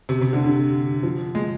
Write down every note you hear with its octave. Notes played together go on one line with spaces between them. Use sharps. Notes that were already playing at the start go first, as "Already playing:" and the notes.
C3
C3
D3
D3
F3
G#3